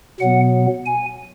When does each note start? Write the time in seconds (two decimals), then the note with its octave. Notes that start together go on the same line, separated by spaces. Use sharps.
0.20 B2 F#3 B3 F#5
0.86 G#5